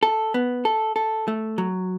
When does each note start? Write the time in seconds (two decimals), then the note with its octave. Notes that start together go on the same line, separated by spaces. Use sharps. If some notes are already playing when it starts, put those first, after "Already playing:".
0.03 A4
0.34 B3
0.65 A4
0.96 A4
1.28 A3
1.58 F#3